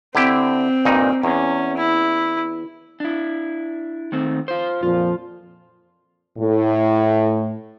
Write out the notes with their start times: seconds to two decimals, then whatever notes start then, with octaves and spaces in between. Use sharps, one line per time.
0.15 D3 C4 E4 G4
0.85 G2 A#2 D#4
1.23 E2 C#4
1.77 E4
3.00 D4 E4
4.12 D#3 A3 C4
4.48 F4 C5
4.83 F2 A#2 F3 F4
6.39 A2